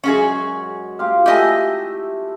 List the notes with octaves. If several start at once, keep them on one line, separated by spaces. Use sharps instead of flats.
F#2 G#3 C#4 F#4 G#4 C#6
F4 G4 F5
A3 E4 G4 D#5 E5 G#5